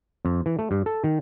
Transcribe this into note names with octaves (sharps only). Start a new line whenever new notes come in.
F2
E3
A3
G2
A4
D#3